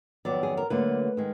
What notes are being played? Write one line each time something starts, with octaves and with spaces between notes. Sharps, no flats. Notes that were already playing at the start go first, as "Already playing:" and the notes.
F2 D#3 F#3 B3 D5
G#4
A#4
D2 D3 F#3 A#3 B4
D#3 G#3